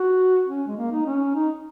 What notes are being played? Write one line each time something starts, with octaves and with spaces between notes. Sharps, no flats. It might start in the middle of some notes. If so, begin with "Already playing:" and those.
Already playing: F#4
C#4
G#3
A#3
D#4
C#4
D#4